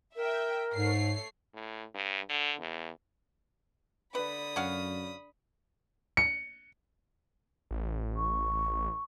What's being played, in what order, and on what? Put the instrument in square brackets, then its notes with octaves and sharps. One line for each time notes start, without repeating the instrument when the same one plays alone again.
[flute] A#4 [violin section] E5 G5
[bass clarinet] G#2 [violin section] A3 C#5 C7
[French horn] A2
G2
D3
E2
[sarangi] D3 [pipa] B4 [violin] B5 D#6
[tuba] F#2 [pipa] C#4 F#4 F5
[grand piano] C#7
[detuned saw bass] A1
[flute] C#6